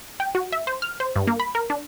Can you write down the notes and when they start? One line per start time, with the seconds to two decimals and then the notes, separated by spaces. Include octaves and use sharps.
0.20 G5
0.35 F#4
0.52 E5
0.67 C5
0.82 F6
1.00 C5
1.16 G2
1.27 A#3
1.40 B5
1.55 A#4
1.70 D4